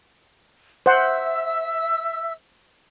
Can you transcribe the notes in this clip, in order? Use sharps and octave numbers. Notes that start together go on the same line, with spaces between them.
C5 E5 F#5 E6